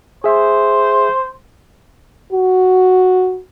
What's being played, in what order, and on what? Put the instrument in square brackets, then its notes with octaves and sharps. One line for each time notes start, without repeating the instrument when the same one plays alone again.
[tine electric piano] G#4 E5 [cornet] C5
[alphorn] F#4